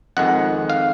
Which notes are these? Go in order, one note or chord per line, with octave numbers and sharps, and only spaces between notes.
F2 D#3 G#3 F#5
F5